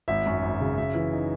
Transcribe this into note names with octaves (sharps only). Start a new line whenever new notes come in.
G#1 E5
F#2
G#1
C#3
F#2 E5
E3
D#4